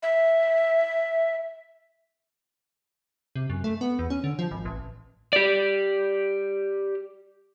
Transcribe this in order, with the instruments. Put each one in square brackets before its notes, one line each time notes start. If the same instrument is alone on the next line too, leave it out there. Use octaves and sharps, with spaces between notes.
[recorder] E5
[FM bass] C3
F#2
A3
B3
E2
C#4
D3
F3
G#1
A1
[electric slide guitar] G4 D5